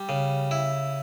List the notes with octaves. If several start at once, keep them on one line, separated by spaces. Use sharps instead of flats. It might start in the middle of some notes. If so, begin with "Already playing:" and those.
Already playing: G3
C#3
E4